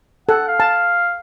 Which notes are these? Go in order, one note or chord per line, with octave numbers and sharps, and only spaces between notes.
A4 F#5
F5
A5